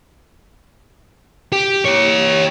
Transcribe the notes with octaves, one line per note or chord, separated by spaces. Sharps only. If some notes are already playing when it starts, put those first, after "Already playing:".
G4
G4 C#5